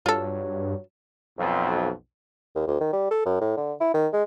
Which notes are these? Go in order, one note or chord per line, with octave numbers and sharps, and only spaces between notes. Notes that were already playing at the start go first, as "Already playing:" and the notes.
G2 F#3 F4 A4
B1 F2
D#2
D2
D#3
G3
A4
F#2
A2
D3
E4
D#3
G#3